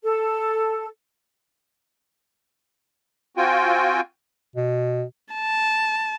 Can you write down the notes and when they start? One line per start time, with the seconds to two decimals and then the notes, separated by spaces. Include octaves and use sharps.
0.03 A4
3.37 C4 F4 F#4 G5 G#5
4.56 B2
5.33 A5